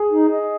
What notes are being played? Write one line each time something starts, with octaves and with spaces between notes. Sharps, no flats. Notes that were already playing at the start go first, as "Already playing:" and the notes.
Already playing: G#4
D#4
D#5